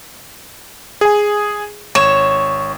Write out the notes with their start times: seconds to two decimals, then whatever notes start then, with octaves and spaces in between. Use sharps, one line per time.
1.01 G#4 G#5
1.95 G#1 C#5 E7